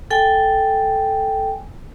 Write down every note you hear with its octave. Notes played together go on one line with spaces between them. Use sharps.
A4 G5 G#5